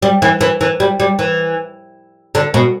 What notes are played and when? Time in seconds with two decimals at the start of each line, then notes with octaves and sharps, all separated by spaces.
0.02 G3
0.22 E3
0.41 E3
0.61 E3
0.80 G3
1.00 G3
1.19 E3
2.35 D3
2.54 B2